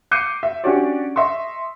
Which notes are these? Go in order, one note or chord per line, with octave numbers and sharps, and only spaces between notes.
D6 G6 C7 C#7 D#7
E5
C#4 D4 F#4 G4 C#5 D5
D#5 E5 C6 C#6